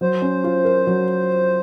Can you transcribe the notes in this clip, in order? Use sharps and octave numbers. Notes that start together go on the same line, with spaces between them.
F#3 C5
C#4
F4
A#4
F#3